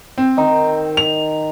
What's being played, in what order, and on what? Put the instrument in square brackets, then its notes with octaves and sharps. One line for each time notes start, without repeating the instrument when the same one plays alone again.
[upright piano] C4
[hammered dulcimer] D#3 D#4
[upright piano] F7